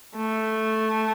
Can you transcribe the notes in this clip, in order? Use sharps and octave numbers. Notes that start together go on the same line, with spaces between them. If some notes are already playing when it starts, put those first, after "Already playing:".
A3